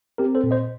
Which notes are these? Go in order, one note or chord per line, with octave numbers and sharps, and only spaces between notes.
C4 G4 A#4
A4 C5
A#2
C5 D#5